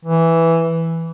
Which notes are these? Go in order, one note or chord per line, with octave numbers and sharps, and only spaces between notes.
E3